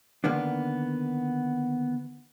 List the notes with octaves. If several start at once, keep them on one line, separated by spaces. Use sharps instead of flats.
D3 D#3 A#3 B3 D4